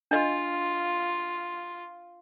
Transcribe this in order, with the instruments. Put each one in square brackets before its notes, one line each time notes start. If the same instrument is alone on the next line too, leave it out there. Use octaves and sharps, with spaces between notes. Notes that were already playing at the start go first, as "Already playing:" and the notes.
[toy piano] D4 D#5 [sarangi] F4